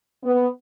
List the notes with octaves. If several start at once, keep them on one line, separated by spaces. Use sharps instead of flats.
B3